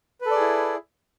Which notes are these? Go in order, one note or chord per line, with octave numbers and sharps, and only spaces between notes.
E4 G#4 A4 B4 D5